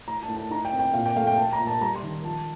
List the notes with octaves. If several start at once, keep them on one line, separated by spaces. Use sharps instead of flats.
A2 A#5
A5
A2
A5
D#4 A#5
G5
C4
G5
A#2 F5
G5
A3 F5
G5
A3 A5
A#5
A#2
A5
G3 A#5
C6
D#3
F3 A5